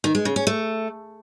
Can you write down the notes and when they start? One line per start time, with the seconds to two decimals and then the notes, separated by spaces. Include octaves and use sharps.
0.04 D#3
0.15 G#3
0.25 C#3
0.36 C#4
0.47 A3